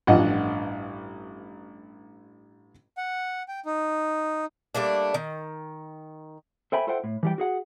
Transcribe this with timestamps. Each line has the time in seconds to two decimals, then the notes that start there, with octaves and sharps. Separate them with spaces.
0.07 A1 G2 F3 D#5 F#5
2.97 F#5
3.48 G5
3.65 D#4
4.75 G3 A3 A#3 D4
5.14 D#3
6.72 A4 C5 E5 G5 G#5 B5
6.87 F4 A4 C5 E5 F#5 G5
7.04 A2
7.23 E3 G3 G5
7.38 F#4 G#4 F#5